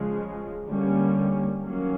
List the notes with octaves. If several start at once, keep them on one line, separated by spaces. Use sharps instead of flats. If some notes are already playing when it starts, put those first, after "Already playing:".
Already playing: C#3 F3 G#3
D3 G3 A#3 C#4
D#3 F#3 A#3 C#4